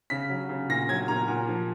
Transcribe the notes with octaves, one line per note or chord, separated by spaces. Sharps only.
C#3 B6
F#3
C#3
A#2 A#6
F#3 G#6
A#2 A#5
A#2
F3